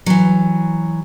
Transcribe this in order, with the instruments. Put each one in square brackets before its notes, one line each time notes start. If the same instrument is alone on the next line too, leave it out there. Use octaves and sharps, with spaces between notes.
[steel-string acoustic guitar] E3 F#3